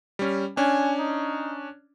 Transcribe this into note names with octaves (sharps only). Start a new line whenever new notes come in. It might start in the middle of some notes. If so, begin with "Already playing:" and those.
G3 C#4
C#4 D4 G#5
D#4